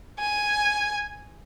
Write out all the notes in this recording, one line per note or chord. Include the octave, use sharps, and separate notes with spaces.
G#5